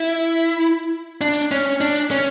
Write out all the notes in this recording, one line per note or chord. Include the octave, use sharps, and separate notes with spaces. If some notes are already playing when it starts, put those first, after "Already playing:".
Already playing: E4
D4
C#4
D4
C#4